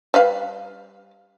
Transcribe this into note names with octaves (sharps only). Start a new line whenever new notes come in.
G3 B4 F5